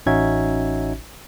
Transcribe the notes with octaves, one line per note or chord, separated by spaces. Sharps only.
A1 C#4 D#4 F#4 E5 G#6